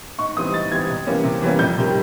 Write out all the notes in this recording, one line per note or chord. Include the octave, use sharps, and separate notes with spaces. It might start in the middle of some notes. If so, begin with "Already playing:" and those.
G#2 C#6
E3 G3 C4 D#6
G#2 A6
E3 G3 C4 G#6
C3
E3 G3 A#3 C#4
C3
E3 G3 A#3 C#4
F2 G6
C3 D#3 G3